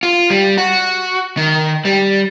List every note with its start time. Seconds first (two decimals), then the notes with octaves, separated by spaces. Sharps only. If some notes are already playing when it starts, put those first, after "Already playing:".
0.03 F4
0.30 G3
0.58 F#4
1.37 D#3
1.85 G3